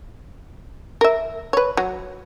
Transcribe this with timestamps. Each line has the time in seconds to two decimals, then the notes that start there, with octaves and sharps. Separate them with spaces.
1.01 A#4 E5
1.53 B4 C#5
1.77 F#3